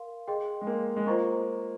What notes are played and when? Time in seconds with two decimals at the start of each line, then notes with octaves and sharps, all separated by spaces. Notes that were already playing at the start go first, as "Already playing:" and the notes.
Already playing: A#4 F5 C6
0.27 G#4 D#5 G5 C6
0.61 G#3
0.67 A#3
0.96 G#3
1.07 A#3 F4 C5 D#5 A#5 C#6